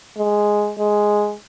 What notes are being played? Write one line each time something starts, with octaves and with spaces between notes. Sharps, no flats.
G#3
G#3